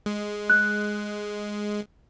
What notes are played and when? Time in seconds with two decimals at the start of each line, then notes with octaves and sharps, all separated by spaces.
0.06 G#3
0.50 F#6